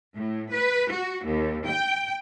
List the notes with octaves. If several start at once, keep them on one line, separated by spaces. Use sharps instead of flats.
A2
B4
F#4
D#2
G5